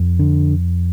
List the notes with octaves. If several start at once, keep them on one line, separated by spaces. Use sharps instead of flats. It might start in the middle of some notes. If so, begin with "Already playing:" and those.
Already playing: F2
D3